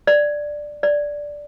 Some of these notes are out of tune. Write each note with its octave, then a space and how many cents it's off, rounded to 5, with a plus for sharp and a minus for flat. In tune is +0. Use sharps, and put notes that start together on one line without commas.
D5 +5
D5 -5